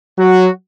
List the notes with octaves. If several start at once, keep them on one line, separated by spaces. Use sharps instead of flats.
F#3 F#4